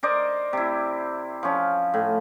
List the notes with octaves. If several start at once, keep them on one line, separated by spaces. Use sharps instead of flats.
A#4 C5 D5 D#5
C3 E4
F3 C#4
A2